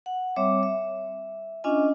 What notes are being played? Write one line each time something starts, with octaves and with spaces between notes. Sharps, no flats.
F#5
G3 C4 C#5 E5 D6
E5
C#4 D4 F4 D#5 G#5